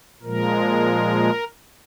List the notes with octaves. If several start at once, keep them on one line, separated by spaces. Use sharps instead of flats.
A#2 F3 G#3 A#4